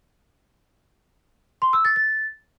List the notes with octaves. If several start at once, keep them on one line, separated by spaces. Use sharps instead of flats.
C6
E6
A6
A6